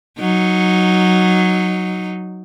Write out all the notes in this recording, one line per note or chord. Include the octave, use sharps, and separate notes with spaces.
F#3 D#4